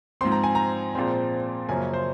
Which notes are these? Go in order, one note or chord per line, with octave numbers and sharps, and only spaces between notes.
G#2 F3 C4 C6
A#5
G#5
A#5
A#2 F3 G#3 C4
F#2 C#3 F3 A#3 C#4 G#5
C5